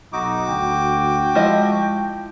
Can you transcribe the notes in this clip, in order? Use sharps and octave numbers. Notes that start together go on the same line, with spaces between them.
B1 D#4 F#4 D6
D2 G5
F3 G#3 E4 D#5